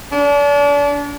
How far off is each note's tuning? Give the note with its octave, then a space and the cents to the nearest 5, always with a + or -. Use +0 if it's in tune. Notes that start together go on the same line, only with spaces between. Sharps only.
D4 -35